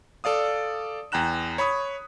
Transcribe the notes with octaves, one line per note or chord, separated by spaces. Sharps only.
A4 D5 F5 D#6
E2 G5 A#5 F#6 E7
C#5 B5 C#6 D#6